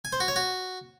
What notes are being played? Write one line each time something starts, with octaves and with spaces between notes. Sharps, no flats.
G#5
C5
F#4
C#5
F#4